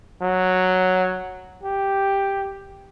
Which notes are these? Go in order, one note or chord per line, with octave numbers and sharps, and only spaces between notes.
F#3
G4